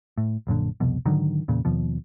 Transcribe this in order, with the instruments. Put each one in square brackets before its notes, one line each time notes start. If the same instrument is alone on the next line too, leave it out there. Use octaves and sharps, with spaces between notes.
[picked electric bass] A2
A#1 F#2 A#2 D3
C2 F2 B2
G#2 D3 D#3 F#3
E2 A#2 C#3
D#2 B2 F3